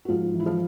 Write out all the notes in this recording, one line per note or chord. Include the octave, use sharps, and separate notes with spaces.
F#4
G#2 F3 F4
E3
E4
F3 F4